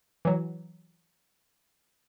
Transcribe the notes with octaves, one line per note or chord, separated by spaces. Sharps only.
E3 F#3